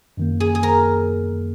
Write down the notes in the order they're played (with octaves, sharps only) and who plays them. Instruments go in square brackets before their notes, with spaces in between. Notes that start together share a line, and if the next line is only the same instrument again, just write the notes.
[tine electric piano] F#2 D#3 A#3
[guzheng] G#4
G#4
A#4